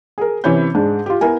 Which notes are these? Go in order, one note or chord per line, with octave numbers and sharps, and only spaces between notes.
G#4 A#4
C3 E3 C#4 C#5 B5 G6
G#2 G#3 D4
F4 G4
B3 E4 A#4 G#5